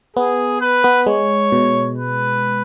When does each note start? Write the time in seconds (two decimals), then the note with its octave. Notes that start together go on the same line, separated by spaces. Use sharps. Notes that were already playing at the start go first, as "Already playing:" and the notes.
0.16 B3 G#4
0.61 B4
0.84 B3
1.06 G#3 C#5
1.52 B2
1.98 B4